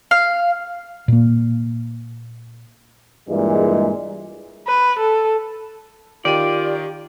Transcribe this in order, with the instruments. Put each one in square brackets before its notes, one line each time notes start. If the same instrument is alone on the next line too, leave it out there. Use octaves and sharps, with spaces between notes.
[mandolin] F5
[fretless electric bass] A#2 A#3
[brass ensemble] G2 A#2 E3 G#3
[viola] B4
A4
[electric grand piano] D#3 G5 D#7 [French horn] F4 [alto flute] G4 [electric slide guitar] D5